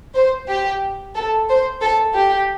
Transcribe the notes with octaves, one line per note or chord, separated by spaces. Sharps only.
C5
G4
A4
C5
A4
G4